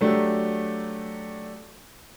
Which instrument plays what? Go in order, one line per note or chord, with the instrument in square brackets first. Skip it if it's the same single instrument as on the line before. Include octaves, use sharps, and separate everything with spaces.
[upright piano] F#3 A3 D4 G4